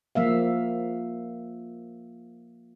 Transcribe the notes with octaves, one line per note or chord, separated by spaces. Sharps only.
F3 A#3 E5 F5